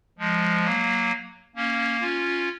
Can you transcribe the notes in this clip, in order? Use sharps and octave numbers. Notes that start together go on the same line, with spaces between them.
F3 G#3
F#3 A#3
A#3 C#4
C#4 F4